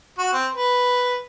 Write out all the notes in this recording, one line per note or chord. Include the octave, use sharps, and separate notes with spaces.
F#4
C4
B4